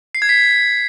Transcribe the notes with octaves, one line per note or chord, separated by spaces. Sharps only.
C7
G#6
B6